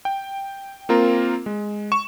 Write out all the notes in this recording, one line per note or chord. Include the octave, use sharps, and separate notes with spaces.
G5
A#3 C4 F4 A#4
G#3
C#6 E7